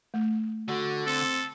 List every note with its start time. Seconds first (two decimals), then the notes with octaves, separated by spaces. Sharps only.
0.14 A3
0.69 D3 F#4
1.07 C4 A4